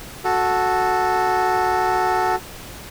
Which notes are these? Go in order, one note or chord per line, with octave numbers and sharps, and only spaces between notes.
F#4 A4